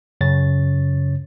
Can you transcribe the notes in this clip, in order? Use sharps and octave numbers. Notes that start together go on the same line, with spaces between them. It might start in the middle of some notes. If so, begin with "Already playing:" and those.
F#2 C#3 C#5 A6